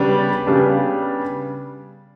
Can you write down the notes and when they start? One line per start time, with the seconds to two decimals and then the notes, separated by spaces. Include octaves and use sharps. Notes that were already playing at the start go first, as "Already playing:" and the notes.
Already playing: C#3 G3 B3 D4
0.47 C#3 G3 B3 D4